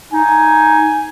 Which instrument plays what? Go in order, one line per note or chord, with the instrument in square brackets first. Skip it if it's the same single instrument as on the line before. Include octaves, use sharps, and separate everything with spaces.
[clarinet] D#4 [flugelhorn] G#5